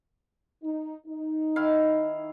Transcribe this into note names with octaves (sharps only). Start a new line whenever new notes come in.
D#4
D#4
D#3 E4 F5